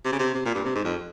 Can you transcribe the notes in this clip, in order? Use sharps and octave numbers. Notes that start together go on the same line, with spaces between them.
C3
C#3
C3
C3
A#2
G2
C3
G#2
F2